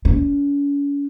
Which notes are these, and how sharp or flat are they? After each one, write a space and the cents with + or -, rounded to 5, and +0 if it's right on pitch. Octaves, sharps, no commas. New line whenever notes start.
C#4 +40